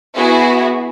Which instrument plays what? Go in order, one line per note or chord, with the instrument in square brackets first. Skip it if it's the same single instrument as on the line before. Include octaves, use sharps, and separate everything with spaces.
[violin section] B3 E4 F#4 G#4